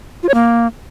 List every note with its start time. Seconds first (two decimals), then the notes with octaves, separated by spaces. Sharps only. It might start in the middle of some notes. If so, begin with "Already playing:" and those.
0.23 F4
0.29 C#5
0.34 A#3